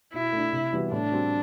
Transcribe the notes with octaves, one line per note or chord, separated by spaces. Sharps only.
B2 E4
A3 D4
C3
E3 G3 B3 F#4
A2 D4
G3 C4 F#4